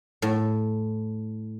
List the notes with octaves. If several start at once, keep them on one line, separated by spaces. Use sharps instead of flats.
A2